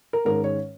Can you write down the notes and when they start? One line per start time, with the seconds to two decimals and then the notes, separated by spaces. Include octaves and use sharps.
0.13 A#4
0.25 G#2 D#3 G#3 C#4 A#4
0.44 C#5